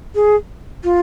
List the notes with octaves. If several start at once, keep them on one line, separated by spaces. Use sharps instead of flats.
G#4
F4